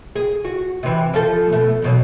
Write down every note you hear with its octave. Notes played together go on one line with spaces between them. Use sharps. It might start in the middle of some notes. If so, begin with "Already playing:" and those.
G#4
F#4
C3 E3
F3 A4
B2 A3
E2 B2 F#3